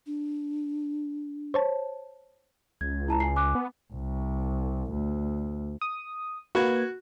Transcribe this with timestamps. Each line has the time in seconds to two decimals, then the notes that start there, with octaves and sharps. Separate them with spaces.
0.06 D4
1.54 C5 C#5 A5
2.81 C#2 G#6
3.08 E4 A5 A#5
3.20 G#5 C7
3.36 G#5 D6 F#6
3.55 B3
3.93 C2
4.91 D2
5.81 D#6
6.55 A#3 F#4 B4 G#6